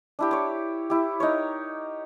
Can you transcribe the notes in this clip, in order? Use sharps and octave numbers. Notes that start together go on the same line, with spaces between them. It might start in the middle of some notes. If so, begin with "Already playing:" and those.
D4 E4 G4
C#5 D6
E4 G4
D#4 A#4 C#5